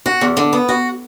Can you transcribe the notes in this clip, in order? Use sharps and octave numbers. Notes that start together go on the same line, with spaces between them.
F#4
E2
D3
B3
F#4